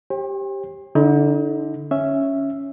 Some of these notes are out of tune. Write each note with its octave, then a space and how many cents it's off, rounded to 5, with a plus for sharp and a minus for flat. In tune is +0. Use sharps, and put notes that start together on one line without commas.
G4 +0 C5 +45 G5 +40
D3 -10 D#4 +40
C#4 +0 E5 +0